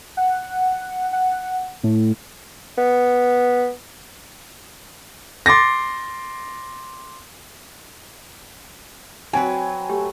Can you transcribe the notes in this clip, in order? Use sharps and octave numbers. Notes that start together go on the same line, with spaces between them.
F#5
F#5
A2
B3
C6 D6 A6 A#6
F#3 C4 B4 G#5
A3 G4